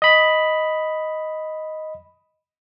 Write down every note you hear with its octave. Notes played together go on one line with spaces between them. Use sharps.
D#5 B5